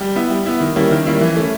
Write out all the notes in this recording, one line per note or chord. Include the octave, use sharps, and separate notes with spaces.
G3
B3 E4
G3
B3 E4
D#3
G3 A#3 C#4 E4
D#3
G3 A#3 C#4 E4
E3
A3 C#4